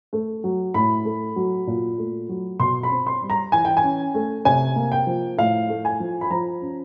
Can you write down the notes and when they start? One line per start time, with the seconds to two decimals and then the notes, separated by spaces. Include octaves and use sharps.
0.13 A3
0.44 F#3
0.74 A2 B5
1.05 A3
1.36 F#3
1.67 A#2
1.98 A3
2.29 F#3
2.60 B2 C6
2.83 B5
2.91 C4
3.07 C6
3.22 G3
3.30 A#5
3.52 E3 G#5
3.65 G5
3.77 G#5
3.84 C#4
4.14 A3
4.45 C3 G#5
4.76 A#3
4.92 G5
5.07 F3
5.38 A2 F5
5.69 A3
5.85 G#5
6.00 F3
6.21 B5
6.30 F3 A#5
6.62 C#4